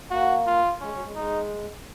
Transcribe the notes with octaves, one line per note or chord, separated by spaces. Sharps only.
A#3 F#4
F4
G#3 C#4
F#3
G#3
G#3 D#4